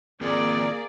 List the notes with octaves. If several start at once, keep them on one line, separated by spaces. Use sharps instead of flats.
D#3 A#3 C4 F4 G#4 A#4 D5